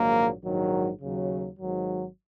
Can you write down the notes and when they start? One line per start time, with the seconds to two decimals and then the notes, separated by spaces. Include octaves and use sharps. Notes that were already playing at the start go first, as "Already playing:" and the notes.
Already playing: A#1 G#2 D#3 F#3 A#3
0.44 A#1 G#2 D#3 F#3
1.01 D#2 C#3 F#3
1.59 G#1 G#2 D#3 F#3